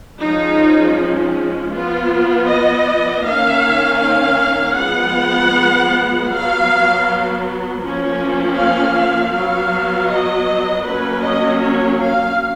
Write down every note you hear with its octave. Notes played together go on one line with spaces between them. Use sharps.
F3 G#3 C#4 D#4
F3 B3 F4
D#5
D#3 A#3 C#4 F5
F5
F3 G#3 B3 F#5
F#3 B3 F5
F3 A#3 C#4
F5
F#3 B3 F5
D#5
F#3 A#3 C#4 B4
D#5
C#5
F5